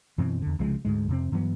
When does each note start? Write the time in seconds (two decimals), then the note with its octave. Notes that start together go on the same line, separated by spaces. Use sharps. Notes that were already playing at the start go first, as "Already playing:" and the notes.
0.18 F#2 B2 E3 C4
0.42 E2 D3
0.59 C2 C#3 F3 G#3
0.85 D2 G#2 G#3
1.08 F2 C3 C4
1.32 G2 E3 F#3 B3